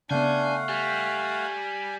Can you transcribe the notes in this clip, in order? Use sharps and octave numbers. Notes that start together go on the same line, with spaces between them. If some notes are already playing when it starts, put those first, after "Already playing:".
C#3 A3 B3 D4 F5 F#5 G#5 G6
G3 G#5